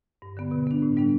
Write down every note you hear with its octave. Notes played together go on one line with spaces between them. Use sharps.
G2
D3 B3
B2
B3 D4
A2
G3 B3 D4